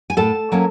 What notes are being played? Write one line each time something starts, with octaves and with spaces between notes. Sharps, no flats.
G#5
A2 A4 A5
F#3 A#3 C#4